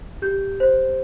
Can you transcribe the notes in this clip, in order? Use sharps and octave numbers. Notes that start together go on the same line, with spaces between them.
G4 G6
C5